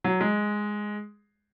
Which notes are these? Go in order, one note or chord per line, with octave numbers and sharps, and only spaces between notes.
F#3
G#3